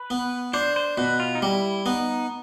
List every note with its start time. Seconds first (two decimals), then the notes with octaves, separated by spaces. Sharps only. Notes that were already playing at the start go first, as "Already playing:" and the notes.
Already playing: B4
0.10 B3
0.54 D4 C5
0.76 C5
0.97 B2 B4
1.20 F4
1.35 D#4
1.42 G3 E4
1.86 B3 D#4